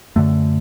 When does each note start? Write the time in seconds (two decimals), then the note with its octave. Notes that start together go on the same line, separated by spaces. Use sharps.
0.16 F#2 D3 A3